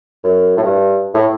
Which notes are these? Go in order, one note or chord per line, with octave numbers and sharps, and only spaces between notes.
F#2
A2
G2
A2